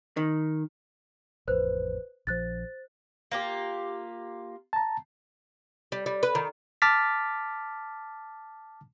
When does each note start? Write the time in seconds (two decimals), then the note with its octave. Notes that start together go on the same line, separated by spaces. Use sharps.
0.17 D#3
1.48 A1 F2 B4 C5 F#6
2.27 A#1 F3 C5 F#6 A6
3.31 A#3 F4 G4
4.73 A5 A#5
5.92 G3
6.06 G3
6.23 B4
6.35 D#3
6.82 A5 D6 F6 A6 B6